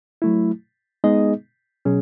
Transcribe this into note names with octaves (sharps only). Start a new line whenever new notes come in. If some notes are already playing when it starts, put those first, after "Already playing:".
F#3 A3 E4
G#3 B3 D#4 G#4 D#5
B2 F#3 C#4 G#4